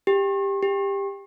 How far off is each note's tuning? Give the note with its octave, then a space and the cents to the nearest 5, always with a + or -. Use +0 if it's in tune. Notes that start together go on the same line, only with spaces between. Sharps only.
G4 +15
G4 +20